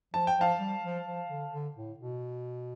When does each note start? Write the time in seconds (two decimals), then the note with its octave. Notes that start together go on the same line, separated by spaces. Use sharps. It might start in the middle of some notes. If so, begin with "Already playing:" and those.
0.14 F3 A5
0.27 G5
0.37 F3 F5 A5
0.60 G3
0.84 F3
1.06 F3
1.29 D3
1.52 D3
1.76 A2
1.99 B2